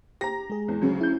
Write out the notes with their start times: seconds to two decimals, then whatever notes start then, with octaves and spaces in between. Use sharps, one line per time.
0.21 G4 A#5 A#6
0.50 G#3 G#4
0.68 E2
0.82 D2 C#3 F#3
1.01 E4 G6